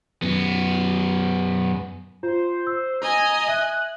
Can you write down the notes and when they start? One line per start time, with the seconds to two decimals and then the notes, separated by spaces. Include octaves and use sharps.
0.22 F#2 B3
2.23 F4 C5
2.67 E6
3.02 D#5 G#5 A#5
3.48 E5 F#6